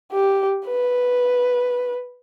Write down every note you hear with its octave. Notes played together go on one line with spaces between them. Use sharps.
G4
B4